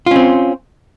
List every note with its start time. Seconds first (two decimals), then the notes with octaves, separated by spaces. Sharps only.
0.06 F4
0.11 C#4
0.16 C4